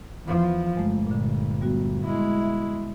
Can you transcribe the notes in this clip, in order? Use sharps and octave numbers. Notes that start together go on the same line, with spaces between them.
E2 F3
G1 G#3 A3
A#2 D3
G3 B3 F#4
G#3 E4
E5